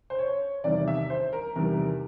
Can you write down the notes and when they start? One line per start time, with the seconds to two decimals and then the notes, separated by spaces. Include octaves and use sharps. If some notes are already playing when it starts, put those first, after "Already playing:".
0.10 C5
0.19 C#5
0.64 E2 C3 D#3 G3 D5
0.88 E5
1.10 C5
1.33 A#4
1.56 E2 C3 D#3 G3 A#4